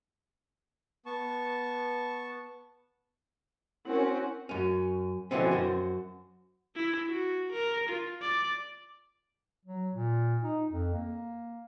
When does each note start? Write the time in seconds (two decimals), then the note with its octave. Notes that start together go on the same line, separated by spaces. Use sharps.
1.06 B3 A5 C#6
3.85 C4 C#4 E4 F#4 A#4
4.49 F#2 C#4
5.31 B2 D3 E3 F3 C4 C#4
5.51 F#2 F#4 C5
6.75 E4
7.09 F#4
7.52 A#4
7.89 F4
8.22 D5
9.65 F#3
9.95 A#2
10.43 D#4
10.70 F2
10.93 A#3